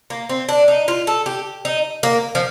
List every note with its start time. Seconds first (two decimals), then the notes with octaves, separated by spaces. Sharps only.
0.10 A#3
0.29 C4
0.49 D4
0.68 D#4
0.88 F4
1.07 A4
1.26 G4
1.65 D#4
2.03 A#3
2.35 F3